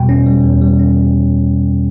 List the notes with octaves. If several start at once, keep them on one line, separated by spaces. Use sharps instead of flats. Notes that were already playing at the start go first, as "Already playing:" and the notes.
Already playing: E2 B2 G3 G5
C#4
G3
E2
G3
C#4